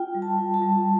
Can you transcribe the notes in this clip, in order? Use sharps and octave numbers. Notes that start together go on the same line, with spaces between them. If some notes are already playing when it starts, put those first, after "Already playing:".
Already playing: F4 G5
G3
A5
F4
A5
G3